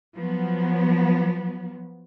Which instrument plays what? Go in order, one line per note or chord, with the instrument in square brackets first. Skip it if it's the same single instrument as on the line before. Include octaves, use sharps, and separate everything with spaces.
[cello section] F3 F#3 B3